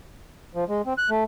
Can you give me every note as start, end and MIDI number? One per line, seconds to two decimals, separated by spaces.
0.55 0.64 53
0.68 0.82 56
0.86 0.93 60
0.98 1.10 90
1.10 1.24 57